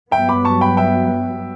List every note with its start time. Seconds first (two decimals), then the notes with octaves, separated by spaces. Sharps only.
0.11 G2 F#3 B3 E5 G5
0.29 B5 D6
0.45 A5 C#6
0.61 G5 B5
0.77 E5 G5